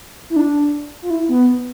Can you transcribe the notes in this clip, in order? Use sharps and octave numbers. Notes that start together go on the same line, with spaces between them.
E4
D4
F4
E4
B3